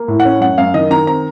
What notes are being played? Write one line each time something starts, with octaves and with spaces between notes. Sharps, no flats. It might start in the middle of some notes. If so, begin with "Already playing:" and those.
Already playing: A#3
A2
F#5
C#4
F#2 F#5
F#2 F5
D#3 D#5
D#3 A#5
C4 A#5